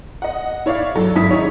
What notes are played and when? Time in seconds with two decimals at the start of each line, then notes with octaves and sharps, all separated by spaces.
0.22 D#5 F#5
0.66 E4 C#5 D5 F5
0.96 F#3 A4
1.15 G#1 F#3 C#4 E4 D#6 B6
1.31 D#4 E4 G#4 C#5